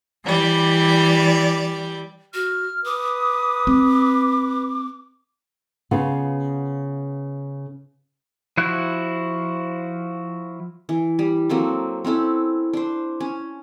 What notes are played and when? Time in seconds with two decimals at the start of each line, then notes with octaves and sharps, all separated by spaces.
0.23 E3 G3 D5
2.34 F#4 F6
2.85 B4 D6 D#6
3.67 C4
5.91 C#3 B3 F4
8.57 F3 E4 F#4 F#6
10.89 E3
11.19 G3
11.49 F#3 A#3 C4 A4
12.05 C4 C#4 E4 A4
12.73 D4 C5
13.20 C#4